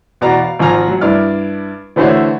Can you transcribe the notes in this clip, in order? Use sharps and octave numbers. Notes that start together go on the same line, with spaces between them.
E2 B2 D5 A#5
F5
G#1 F3 G#5 A#5 F6
F#3
G2 E4 D5 F6
D3 E3 A3 F#4 C5 C#5